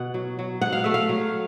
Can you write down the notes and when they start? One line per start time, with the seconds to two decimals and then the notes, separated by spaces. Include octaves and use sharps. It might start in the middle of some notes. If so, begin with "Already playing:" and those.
Already playing: B2 F#5
0.14 F#3
0.39 F#3
0.61 B2 F#5
0.73 F5
0.84 A3 E5
0.94 F5
1.09 F#3